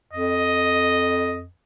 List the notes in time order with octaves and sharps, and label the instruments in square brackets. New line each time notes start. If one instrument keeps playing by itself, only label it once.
[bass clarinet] F2 [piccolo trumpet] D#5